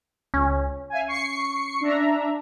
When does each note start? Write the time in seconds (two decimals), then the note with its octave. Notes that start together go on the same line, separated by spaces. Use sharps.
0.34 C#2 C#4
0.90 E5 F5 G#5
1.08 C#6 C7 C#7
1.81 D4 E5 A#5